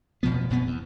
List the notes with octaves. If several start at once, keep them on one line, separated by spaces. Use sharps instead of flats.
F1 B2 F3 B3
F#1 B2 B3
E2